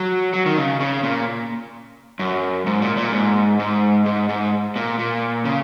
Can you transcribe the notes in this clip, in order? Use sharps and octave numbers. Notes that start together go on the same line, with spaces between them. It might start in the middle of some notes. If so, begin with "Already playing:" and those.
Already playing: F#3
F#3
D#3
C#3
C#3
A#2
F#2
G#2
A#2
A#2
G#2
G#2
G#2
G#2
A#2
A#2
C#3